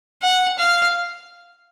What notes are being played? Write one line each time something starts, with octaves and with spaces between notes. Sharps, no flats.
F#5
F5